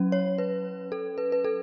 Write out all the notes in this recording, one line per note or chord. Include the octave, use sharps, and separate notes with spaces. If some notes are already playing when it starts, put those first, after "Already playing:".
Already playing: F#3 C#4
C#5
B4
A4
B4
B4
A4